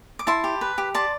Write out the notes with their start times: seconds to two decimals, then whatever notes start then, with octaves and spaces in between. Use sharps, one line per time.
0.19 D6
0.27 E4 A5 C6
0.44 G4
0.61 B4
0.78 G4
0.94 D5 A5 C6